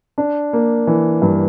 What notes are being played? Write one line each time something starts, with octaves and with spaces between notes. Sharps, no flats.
D4
A#3
E3
G2